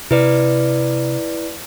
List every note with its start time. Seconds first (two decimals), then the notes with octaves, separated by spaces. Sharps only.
0.11 C3 E4 B4 D5